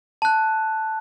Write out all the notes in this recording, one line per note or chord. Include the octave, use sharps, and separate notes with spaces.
A5 F#6